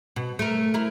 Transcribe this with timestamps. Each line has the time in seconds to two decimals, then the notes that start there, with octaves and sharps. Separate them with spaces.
0.16 B2
0.39 A3 A#4
0.74 E4 A#4